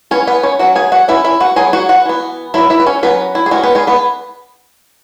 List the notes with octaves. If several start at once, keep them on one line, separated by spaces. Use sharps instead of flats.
E3 B3 C#4 C#5
B3 B4
C#4 C#5
F#3 C#4 F#4 F#5
G#4 G#5
F#4 F#5
E3 C#4 E4 E5
E4 E5
F#4 F#5
F#3 B3 G#4 G#5
F#4 F#5
F#4 F#5
E3 B3
F#3 B3 E4 E5
E4 E5
B4
C#4 C#5
F#3 B3 C#4 B4
E4
G#4
E3 G#3 C#4 F#4
B3 B4
G#3 G#4
B3 B4